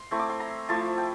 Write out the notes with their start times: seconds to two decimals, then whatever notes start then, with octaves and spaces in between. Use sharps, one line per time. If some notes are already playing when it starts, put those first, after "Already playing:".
Already playing: C6
0.11 A3 C4 E4
0.19 D6
0.30 C6
0.40 A#5
0.69 F3 A3 E4 A5
0.98 G5